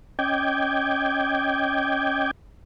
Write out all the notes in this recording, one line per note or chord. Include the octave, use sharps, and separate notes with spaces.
C#4 D#5 G5 D6 G6 G#6